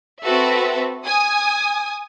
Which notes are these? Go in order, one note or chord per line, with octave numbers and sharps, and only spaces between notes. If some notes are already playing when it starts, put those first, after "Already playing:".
C4 F#4 A4 B4 E5
G#5 D#6